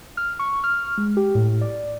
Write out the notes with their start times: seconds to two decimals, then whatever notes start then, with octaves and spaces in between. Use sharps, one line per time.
0.17 F6
0.39 C#6
0.64 F6
0.98 G#3
1.17 G4
1.35 A2
1.61 D5